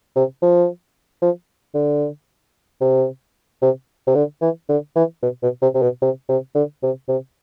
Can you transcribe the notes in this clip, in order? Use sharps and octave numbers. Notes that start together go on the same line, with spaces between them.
C3
F3
F3
D3
C3
C3
C3
D3
E3
D3
E3
B2
B2
C3
C3
B2
C3
C3
D3
C3
C3